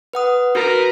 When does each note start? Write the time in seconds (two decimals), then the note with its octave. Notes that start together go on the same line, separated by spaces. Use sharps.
0.13 B4 F#5 D#6
0.55 F#4 A#4 B4